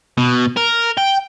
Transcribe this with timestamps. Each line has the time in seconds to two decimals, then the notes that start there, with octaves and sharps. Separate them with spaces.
0.18 B2
0.56 A#4
0.98 G5